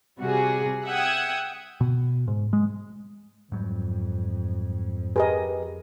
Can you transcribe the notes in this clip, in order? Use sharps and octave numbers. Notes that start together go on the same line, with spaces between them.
C3 G3 F#4 G#4
E5 F#5 G5 D#6 G#6
B2
G#2
G#3
F2 G#2 F#3 G3
G4 G#4 A#4 B4 D#5